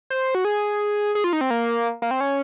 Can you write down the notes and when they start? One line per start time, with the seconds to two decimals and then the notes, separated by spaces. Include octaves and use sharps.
0.10 C5
0.35 F#4
0.45 G#4
1.15 G#4
1.24 F4
1.33 D#4
1.41 C4
1.50 A#3
2.02 A#3
2.11 C4
2.21 C#4